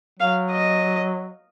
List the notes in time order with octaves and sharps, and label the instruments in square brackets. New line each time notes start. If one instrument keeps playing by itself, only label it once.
[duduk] F#3 [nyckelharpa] F5
[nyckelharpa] D#5